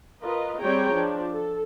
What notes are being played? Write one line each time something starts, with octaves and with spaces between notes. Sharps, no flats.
F4 A#4 B4 D#5
G3 C4 G#4 C#5 G5 A#5
F3 D4
A4